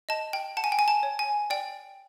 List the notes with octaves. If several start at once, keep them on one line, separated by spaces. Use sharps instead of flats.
D#5 A5
G5
F#5 A5
G#5
G5
G#5
A5
C#5
G#5
D5 G5